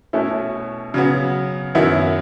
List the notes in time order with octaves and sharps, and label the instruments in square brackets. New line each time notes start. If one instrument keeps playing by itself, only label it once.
[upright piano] B2 A3 C#4 E4
C#3 F#3 B3
F#2 D#3 F#3 B3 E4